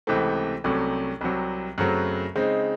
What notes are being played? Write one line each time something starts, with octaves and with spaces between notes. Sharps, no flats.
C#2 C3 E3 A3 C4
C2 C3 F#3 A3 C#4
C2 C3 F#3
F#2 C#3 F#3 A3 C4
C#3 G#3 C4 D#4